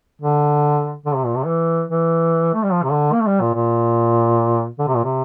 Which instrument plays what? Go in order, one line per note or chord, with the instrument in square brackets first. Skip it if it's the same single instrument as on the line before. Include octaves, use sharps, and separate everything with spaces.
[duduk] D3
D3
C3
A#2
C3
E3
E3
A3
G3
F3
C3
D3
A#3
A3
G3
A#2
A#2
D3
C3
A#2
C3